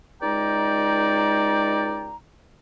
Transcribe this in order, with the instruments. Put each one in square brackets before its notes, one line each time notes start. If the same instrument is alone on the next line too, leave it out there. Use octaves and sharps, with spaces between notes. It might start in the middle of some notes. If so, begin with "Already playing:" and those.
[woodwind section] C#2 G#3 D#4 D5 G5 A#5